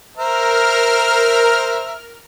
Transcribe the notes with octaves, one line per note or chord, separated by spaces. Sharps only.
A#4 C5 E5 A#5 F6